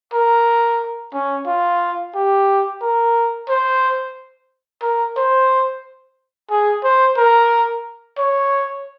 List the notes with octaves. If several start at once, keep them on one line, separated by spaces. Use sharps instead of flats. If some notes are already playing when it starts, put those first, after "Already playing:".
A#4
C#4
F4
G4
A#4
C5
A#4
C5
G#4
C5
A#4
C#5